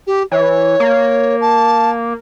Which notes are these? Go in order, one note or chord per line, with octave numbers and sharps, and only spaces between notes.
G4
E3 C#5
A#3
A5